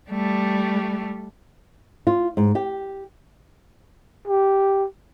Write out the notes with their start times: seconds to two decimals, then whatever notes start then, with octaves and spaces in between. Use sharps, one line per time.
0.10 G3 A3
2.07 F4
2.37 G#2
2.55 G4
4.27 G4